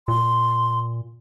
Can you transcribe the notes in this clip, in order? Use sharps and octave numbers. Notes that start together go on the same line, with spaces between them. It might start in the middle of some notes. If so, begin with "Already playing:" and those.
A#2 C6